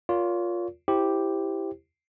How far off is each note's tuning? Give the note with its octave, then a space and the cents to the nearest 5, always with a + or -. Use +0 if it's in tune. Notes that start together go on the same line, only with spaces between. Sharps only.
F4 +10 A#4 +15 C#5 +45
E4 +0 G4 +0 C5 +10